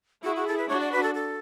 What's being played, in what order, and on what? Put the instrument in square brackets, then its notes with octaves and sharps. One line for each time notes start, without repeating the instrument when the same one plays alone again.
[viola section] E4 G#4 [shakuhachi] F#4
[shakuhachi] F#4
A4
B4
[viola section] D4 F#4 [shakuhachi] C#5
[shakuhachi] D5
B4
A4
A4